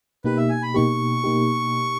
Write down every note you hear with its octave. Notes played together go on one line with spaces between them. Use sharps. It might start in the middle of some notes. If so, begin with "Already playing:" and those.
B2 A#3 D#4 G4 B4
E5
G#5
B5
B2 A#3 D#4 G4 C#6
B2 A#3 D#4 G4